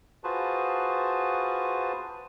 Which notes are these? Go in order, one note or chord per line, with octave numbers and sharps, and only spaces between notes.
F4 F#4 G#4 B4 C5 A5